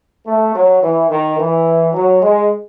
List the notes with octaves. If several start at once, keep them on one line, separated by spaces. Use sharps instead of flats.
A3
F#3
E3
D#3
E3
F#3
G#3